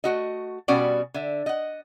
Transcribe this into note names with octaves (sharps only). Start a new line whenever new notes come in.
A3 F#4 D#5
B2 G3 C#4 F#4 G4 D5
D3 E5
D#5 F#5